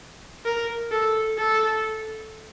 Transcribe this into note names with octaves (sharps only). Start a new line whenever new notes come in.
A#4
A4
A4